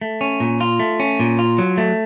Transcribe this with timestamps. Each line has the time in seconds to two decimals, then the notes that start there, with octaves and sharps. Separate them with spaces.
0.01 A3
0.21 C#4
0.40 A#2
0.61 F4
0.80 A3
1.00 C#4
1.20 A#2
1.39 F4
1.58 F#3
1.78 A3